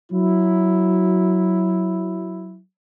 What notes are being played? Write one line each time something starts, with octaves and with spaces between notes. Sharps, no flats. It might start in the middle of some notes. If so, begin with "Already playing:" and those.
F#3 E4